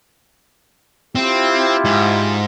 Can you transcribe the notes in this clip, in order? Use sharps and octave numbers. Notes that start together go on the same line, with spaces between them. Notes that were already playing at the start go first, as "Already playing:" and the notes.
C4 E4 F4 G4
G#2